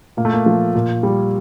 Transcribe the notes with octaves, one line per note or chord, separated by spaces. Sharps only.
A#2 A#3
A3
A#3
F3
A#2
G3